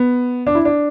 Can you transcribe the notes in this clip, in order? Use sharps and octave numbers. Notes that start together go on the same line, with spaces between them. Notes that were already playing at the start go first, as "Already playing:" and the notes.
Already playing: B3
D4
E4
D4